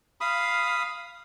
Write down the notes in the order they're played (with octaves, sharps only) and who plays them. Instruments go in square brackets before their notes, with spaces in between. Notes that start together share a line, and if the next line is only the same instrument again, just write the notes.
[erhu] F5 [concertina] B5 D#6